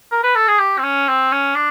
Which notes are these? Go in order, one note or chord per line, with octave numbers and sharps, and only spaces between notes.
A#4
B4
A4
G#4
G4
C4
C#4
C4
C#4
D4